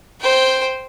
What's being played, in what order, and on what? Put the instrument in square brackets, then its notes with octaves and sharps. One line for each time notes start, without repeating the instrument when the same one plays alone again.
[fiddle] C5 G5